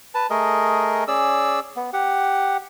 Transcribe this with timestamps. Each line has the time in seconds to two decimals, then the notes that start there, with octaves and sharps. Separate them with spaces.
0.15 B4 A5
0.30 A3 G#4 A#4 D#5
1.08 C#4 G#4 D5 E6
1.76 B3
1.93 G4 F#5